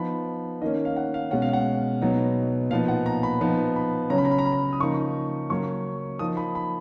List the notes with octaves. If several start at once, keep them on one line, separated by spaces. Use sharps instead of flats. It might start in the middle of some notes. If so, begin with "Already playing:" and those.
Already playing: F3 B3 D#4 B5
D#3 A#3 C#4 D#5
F5
F#5
F5
B2 G#3 C#4 F#5
F5
F#5
B2 F#3 B3 D#4
A#2 F3 B3 D#4 F5
F#5
A#5
B5
F3 B3 D#4
B5
C#3 F#3 C#4 A#5
B5
A#5
B5
A#5
B5
A#5
D#6
C#3 F3 A#3 D#4 C#6
C#3 F#3 A#3 C#4 C#6
F3 A#3 D#4 D#6
B5
B5